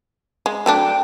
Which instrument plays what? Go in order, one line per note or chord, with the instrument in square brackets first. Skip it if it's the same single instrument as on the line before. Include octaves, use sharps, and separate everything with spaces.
[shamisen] G#3
[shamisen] F#3 A3 D4 [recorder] G5